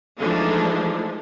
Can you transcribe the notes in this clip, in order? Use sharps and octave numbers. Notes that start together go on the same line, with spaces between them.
E3 F3 G#3 A3 D4 D#4